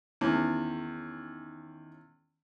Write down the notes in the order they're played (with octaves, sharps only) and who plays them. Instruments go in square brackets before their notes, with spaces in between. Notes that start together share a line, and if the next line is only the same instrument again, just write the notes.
[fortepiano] E2 [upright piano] D#3 G#3 C#4